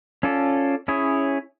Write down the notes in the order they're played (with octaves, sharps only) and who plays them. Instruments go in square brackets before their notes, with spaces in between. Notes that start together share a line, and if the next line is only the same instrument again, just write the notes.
[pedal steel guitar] C#4 F4 A4 D5
C#4 E4 G#4 C#5